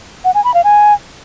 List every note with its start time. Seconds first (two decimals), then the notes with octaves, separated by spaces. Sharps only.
0.24 F#5
0.34 G#5
0.44 B5
0.54 F5
0.64 G#5